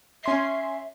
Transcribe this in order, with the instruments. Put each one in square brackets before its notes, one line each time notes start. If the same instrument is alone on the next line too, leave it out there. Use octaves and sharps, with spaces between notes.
[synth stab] C#4 C6 C7 [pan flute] E5